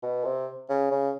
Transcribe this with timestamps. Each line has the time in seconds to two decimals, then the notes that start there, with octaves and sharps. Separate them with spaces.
0.03 B2
0.25 C3
0.69 C#3
0.91 C#3